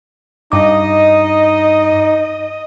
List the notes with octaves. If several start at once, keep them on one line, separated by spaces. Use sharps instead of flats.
G2 D#4 D#5 D6